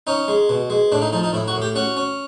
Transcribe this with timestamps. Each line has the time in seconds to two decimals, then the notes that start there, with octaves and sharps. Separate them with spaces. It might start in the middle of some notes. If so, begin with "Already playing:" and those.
0.07 C#4 D#4
0.28 G#3
0.49 B2
0.70 G#3
0.92 A2 D4
1.02 D#4
1.13 F3 D#4
1.23 D#4
1.33 A2 E4
1.48 F#4
1.55 A2
1.62 G4
1.76 C#4 F#4
1.97 C#4